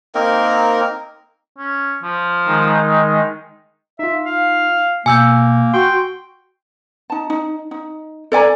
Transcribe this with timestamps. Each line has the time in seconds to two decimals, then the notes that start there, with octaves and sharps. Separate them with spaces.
0.15 A#3 C4 D#4 A#4
1.58 C#4
2.03 F3
2.46 D#3 G#3 D#4
3.99 D#4 F4 E5
4.25 F5
5.06 B2 A#3 G#5 E6 G6
5.74 F#4 G5 C6 C#6
7.10 D#4 A5
7.30 D#4
7.71 D#4
8.32 A4 D5 G#5 A#5